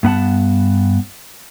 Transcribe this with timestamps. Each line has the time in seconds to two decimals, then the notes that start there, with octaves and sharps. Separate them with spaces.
0.03 G2 B3 F#5 A5